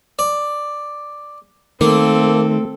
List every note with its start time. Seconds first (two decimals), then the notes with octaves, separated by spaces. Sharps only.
0.19 D5
1.81 D#3 A3 A#3 C4 A4